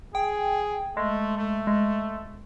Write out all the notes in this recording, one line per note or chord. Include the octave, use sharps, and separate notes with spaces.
G#4 G5
G#3 A3
A3
G#3